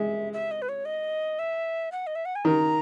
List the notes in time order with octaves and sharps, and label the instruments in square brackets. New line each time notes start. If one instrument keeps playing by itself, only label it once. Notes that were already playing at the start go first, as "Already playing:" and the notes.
Already playing: [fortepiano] G#3 [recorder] E5
[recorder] E5
D#5
B4
C#5
D#5
E5
F#5
D#5
E5
F#5
G#5
[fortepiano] D#3 [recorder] A#5